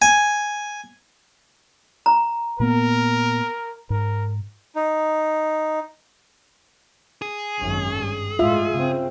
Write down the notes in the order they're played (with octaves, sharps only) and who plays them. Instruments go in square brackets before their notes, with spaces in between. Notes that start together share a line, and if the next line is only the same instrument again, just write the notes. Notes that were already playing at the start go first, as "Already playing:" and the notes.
[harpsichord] G#5
[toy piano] A#5
[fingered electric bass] A#2 A#3 B3 [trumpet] A#4
[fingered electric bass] G#2 [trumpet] A#4
[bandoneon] D#4
[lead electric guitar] G#4
[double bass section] G#1 F#2 C#4
G2
[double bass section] A2 G#3 [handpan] F4 E5
[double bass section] C#3 C4